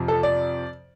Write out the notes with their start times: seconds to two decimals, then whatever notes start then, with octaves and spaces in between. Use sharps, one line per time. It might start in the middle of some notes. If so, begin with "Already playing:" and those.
Already playing: F2 C3 F3
0.08 A4
0.23 D5